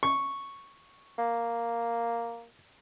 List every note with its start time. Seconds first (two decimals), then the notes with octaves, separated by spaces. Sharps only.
0.03 C#6
1.18 A#3